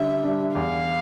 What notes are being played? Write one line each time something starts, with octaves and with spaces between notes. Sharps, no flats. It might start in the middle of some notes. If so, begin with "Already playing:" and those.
Already playing: D3 G3 D4 E5
G3 D4
E2 F5